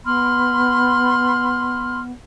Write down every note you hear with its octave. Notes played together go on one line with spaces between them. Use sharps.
B3 B5 C6 F6